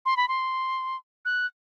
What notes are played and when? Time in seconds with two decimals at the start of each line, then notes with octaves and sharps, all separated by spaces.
0.06 C6
0.17 B5
0.28 C6
1.25 F#6